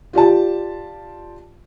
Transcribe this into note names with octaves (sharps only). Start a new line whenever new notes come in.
F4 G4 D5 A5